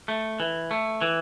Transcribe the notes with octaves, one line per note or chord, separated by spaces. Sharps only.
A3
E3
A3
E3